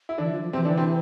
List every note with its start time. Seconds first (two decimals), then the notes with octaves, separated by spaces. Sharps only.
0.09 E4
0.18 D3 E3 D4
0.30 F3
0.42 F3
0.53 C3 E3 C4
0.65 D3 D4
0.77 C3 C4